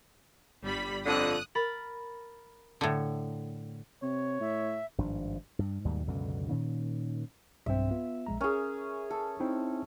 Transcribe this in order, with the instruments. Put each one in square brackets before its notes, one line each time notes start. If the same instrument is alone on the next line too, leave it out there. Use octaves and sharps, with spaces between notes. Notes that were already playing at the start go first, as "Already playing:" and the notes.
[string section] G1 G3 B5
[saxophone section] F2 D3 [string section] D#6 F#6
[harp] A#4 B5 A6
[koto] A2 D3
[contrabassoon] C3 [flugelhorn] C#5
[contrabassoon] A2 [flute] E5
[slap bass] G#1 G2 F3 D4
G2
D#2 G#2 B2 G3
C#2 F#2 B2 D3
A#2 D#3 C#4
[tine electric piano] B1 G2 C4 [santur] E5
[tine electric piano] B3 F4
A#1 G#3 A#5
[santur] C#4 G#4 [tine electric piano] A#4
[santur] A4
[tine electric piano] C4 D#4 E4